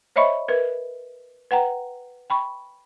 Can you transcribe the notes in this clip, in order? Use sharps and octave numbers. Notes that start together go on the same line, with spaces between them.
C5 C#5 D#5 E5 B5 C#6
A#4 B4 E5
B4 F#5 G5 A#5
G5 B5 C#6